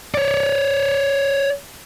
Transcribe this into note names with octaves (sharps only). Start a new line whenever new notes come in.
C#5 D5